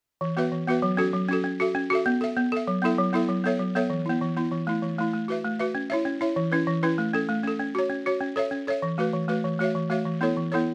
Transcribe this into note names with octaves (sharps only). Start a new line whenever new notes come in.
E3
B3 F#4 B4 E5
E3
B3 F#4 B4 E5
F#3
C#4 F#4 A4
F#3
C#4 F#4 A4
C#4
F#4 A4 E5
C#4
F#4 A4 E5
B3
A4 E5
B3
A4 E5
F#3
B3 E4 A4 E5
F#3
B3 E4 A4 E5
F#3
B3 A4 C#5 E5
F#3
B3 A4 C#5 E5
E3
B3 E4
E3
B3 E4
E3
A3 E4
E3
A3 E4
A3
F#4 B4 E5
A3
F#4 B4 E5
C#4
E4 C#5 E5
C#4
E4 C#5 E5
E3
C#4 E4 B4
E3
C#4 E4 B4
A3
C#4 A4
A3
C#4 A4
C#4
F#4 C#5
C#4
F#4 C#5
C#4
A4 C#5 E5
C#4
A4 C#5 E5
E3
A3 F#4 B4
E3
A3 F#4 B4
E3
A3 F#4 C#5 E5
E3
A3 F#4 C#5 E5
E3
B3 E4 A4 C#5
E3
B3 E4 A4 C#5